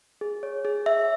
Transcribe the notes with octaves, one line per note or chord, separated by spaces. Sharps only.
G#4
C#5
G#4
E5